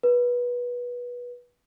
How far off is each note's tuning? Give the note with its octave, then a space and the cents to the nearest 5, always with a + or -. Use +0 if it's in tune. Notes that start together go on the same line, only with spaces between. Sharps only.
B4 -20